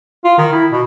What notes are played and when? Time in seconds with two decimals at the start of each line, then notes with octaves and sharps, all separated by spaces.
0.24 F4
0.38 D#3
0.52 E4
0.72 B2